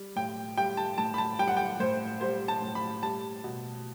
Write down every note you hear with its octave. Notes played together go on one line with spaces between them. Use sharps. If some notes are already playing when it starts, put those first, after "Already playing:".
Already playing: G3
A2 G5
G3 G5
A5
A2 A5
B5
A5
G3 G5
F#5
G5
A2 C5
G3 C5
A5
A2
B5
G3 A5
B2